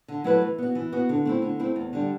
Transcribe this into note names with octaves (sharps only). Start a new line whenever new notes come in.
D3
F#3 A3 E4 B4
E3
B3 F#4
E3
B3 F#4
D3
A3 C4 E4
D3
A3 C4 E4
E2
D3 G3